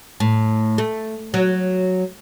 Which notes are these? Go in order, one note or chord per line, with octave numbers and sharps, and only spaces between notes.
A2
A3
F#3